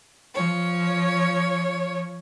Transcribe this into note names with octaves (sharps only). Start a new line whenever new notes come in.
F3 C#5